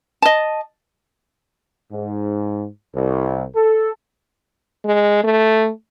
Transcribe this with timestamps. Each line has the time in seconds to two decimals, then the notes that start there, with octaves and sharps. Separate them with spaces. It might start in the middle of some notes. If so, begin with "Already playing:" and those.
0.22 D#5 A5
1.92 G#2
2.94 C2
3.55 A4
4.85 G#3
5.23 A3